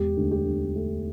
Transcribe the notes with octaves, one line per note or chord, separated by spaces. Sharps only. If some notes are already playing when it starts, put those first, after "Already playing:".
Already playing: E1 G4
D2
G4
D3
A3